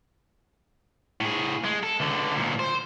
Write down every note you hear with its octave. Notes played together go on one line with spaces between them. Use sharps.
A2 G#4
G#3
A4
C#2 D3
D2 A#2
C5